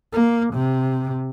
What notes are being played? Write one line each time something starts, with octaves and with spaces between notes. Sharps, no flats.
A#3
C3